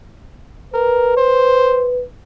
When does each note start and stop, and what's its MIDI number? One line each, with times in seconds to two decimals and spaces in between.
0.74 1.12 70
0.74 2.03 71
1.17 1.89 72